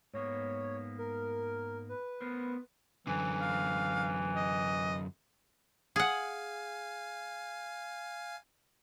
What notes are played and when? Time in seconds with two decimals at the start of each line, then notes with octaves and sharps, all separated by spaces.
0.14 G#2 A#3 B3 C#5
0.98 A#4
1.89 B4
2.21 B3 A#4 C5
3.07 F#2 D3 E3
3.41 F5
4.36 D#5
5.96 G#4 F5 F#5 G#5